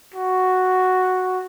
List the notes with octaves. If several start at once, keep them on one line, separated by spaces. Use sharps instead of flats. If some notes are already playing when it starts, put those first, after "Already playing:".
F#4